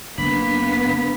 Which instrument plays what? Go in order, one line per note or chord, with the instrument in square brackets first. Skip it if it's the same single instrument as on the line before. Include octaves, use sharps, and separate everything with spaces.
[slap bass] F#1 [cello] A#3 B3 [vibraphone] D4 B5 [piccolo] B6